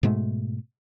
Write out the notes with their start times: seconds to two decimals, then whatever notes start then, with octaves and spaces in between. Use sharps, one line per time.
0.03 G#2 B2 G#3 A3